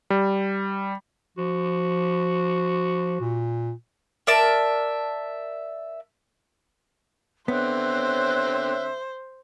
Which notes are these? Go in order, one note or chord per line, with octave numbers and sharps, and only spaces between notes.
G3
F3 F#4
A#2
A#4 D5 E5 A5
D3 B3 C4 C5 C#5 E5 F#6